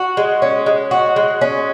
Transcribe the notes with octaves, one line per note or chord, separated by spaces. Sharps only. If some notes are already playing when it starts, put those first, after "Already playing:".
Already playing: F#4
G#3
C#4
G#3
F#4
G#3
C#4